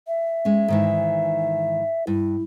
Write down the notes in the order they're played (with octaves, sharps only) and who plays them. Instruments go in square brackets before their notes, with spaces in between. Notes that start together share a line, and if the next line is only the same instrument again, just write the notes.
[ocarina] E5
[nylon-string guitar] G#3 C#4
G#2 D#3 E3
[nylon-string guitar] G2 [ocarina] E4